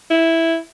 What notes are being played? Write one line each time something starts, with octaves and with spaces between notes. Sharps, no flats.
E4